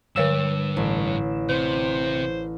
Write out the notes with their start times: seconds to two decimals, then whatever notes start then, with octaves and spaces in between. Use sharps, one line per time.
0.16 G2 D3 C#5 E6 E7
0.77 A1
1.49 C3 C5